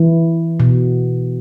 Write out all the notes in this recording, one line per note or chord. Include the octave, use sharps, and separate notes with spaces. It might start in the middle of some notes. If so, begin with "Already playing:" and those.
Already playing: E3
B2